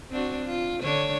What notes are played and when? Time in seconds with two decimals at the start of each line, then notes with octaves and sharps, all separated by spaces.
0.10 C4 D4 F#4
0.45 F4
0.82 D3 D4 C#5